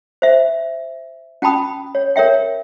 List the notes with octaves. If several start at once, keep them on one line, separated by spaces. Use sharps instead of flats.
C5 E5
C#4 G5 A5 B5 D#6
C#5
A#4 C#5 E5 G5